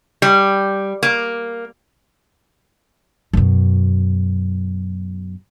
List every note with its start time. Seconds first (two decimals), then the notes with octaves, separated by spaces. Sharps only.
0.22 G3
1.03 A#3
3.33 F#2 B2